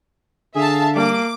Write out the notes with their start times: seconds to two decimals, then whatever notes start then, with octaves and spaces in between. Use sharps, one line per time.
0.56 D3 G#4 E5 F5 A5
0.96 G3 A#3 D6